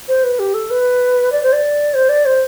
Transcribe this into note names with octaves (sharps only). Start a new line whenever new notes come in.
C5
B4
G4
A4
B4
D5
C5
D5
C5
D5
C5